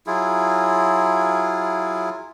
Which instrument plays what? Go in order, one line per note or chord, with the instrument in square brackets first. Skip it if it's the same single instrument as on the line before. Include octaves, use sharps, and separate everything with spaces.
[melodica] F#3 E4 F4 G#4